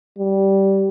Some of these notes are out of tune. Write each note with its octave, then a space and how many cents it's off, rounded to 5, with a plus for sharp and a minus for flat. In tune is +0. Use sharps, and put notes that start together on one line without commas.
G3 -10